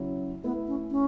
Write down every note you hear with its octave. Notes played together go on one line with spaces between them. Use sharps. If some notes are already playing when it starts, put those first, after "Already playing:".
Already playing: C#3 F#3 C#4 E4
A3 B3 E4 B4
C#4
C#4